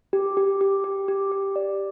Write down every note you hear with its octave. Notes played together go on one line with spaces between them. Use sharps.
G4
G4
G4
G4
G4
G4
D5